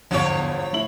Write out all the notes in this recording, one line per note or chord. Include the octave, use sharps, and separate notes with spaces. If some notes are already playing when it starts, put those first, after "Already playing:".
G1 E2 G#2 D3 E3 F3 C#5
A2 E4 F#7